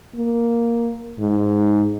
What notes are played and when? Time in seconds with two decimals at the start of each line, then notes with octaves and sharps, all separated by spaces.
0.15 A#3
1.19 G#2